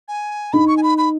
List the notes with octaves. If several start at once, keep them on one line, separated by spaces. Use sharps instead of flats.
G#5
D#4 B5
C#6
G#5
B5
B5